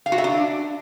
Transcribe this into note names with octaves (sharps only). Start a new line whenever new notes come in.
F5
F#4
E5
D4